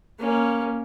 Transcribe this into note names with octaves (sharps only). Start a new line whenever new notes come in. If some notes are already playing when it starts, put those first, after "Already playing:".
A#3 C#4